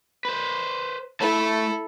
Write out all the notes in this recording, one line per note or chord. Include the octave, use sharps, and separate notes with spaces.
B4 C5
A3 E4 A4 A5